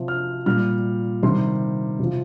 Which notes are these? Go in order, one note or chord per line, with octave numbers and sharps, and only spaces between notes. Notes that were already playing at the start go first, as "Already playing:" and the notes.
Already playing: C3 F3
F6
A#2 G3 F6
C3 D#3 G3 C6
C3 F3